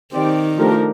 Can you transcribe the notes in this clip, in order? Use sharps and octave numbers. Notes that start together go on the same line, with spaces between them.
D#3 C4 G4 D5
F3 A3 D4 G4 A#4